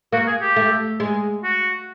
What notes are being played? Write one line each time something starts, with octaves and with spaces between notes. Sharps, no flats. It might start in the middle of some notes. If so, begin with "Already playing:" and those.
A#3 F#4
G#4
G4
A3
G#3
F#4